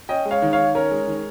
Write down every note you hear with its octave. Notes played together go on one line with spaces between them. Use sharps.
C#4 D#5 G5
G#3
C#5 F5
D#3
C#5 F5
D#3
C#4 A#4 C#5
G#3
D#3